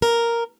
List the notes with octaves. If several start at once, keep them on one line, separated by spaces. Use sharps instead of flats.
A#4